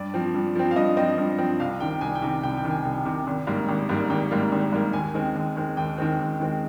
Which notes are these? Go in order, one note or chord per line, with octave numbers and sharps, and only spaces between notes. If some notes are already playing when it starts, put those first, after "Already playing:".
Already playing: G2 D5
F3 C4
G2
F3 C4
F5
G2 D#5
F3 C4 D#5
G2
F3 C4
C2 F5
C3 D#3 G5
C2 G#5
G5
C3 D#3
C2 G5
G5
C3 D#3
G#5
C2
C3 D#3
G#1
G#2 G3 A#3
G#1
G#2 G3 A#3
G#1 G5
G#2 G3 A#3
G#1
G#2 G3 A#3
D#2 G#5
D#3 G#3 C4
D#2
D#3 G#3 C4
D#2 G5
D#3 G#3 C4
D#2
D#3 G#3 C4